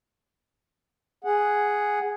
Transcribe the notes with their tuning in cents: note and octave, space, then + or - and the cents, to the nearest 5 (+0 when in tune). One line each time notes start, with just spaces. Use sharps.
G#4 +0 F#5 +0